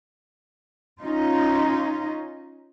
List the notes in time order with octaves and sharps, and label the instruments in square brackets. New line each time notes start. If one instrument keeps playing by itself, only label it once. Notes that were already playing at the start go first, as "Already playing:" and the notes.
[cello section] C#4 D#4 F4